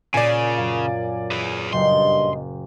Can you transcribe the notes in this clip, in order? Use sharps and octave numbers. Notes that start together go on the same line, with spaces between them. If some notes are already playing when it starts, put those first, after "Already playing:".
A#2 C#3 D5 G#5
F#2 F5
G#4 B4
F#1 G2 D#5 G5 C6